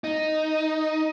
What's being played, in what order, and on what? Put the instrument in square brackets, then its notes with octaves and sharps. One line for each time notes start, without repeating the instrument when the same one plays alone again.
[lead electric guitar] D#4